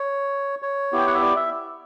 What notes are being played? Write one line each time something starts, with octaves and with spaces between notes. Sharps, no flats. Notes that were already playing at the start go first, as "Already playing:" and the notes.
Already playing: C#5
C#5
B3 E4 G4
G5
F#5
E5
D5
E5